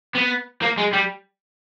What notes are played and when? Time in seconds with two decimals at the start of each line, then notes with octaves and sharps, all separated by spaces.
0.16 B3
0.62 A#3
0.78 G#3
0.93 G3